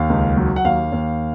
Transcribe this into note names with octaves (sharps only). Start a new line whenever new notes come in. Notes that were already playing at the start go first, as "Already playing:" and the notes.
Already playing: D#2 F5
C#2
F#3
F#5
D#2 F5
D#2